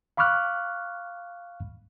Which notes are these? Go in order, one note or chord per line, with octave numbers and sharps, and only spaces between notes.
F5 B5 C#6 D6 F6 F#6